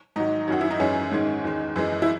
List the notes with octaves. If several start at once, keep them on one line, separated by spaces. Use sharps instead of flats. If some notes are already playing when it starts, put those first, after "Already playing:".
G#2 D#3 F#3 D#4
F#2 D#3 F#3 F#4
E4
D#4
F#2 E3 G#3 C#4
G#2 D#3 G#3
E2 D#3 G#3
F#2 E3 G#3
E4